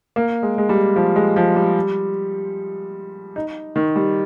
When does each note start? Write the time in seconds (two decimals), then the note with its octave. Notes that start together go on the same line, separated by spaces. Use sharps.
0.16 A#3
0.43 G#3
0.58 G#3
0.69 G3
0.96 F3
1.16 G#3
1.36 F3
1.56 G3
3.36 D#4
3.76 D#3
3.96 G3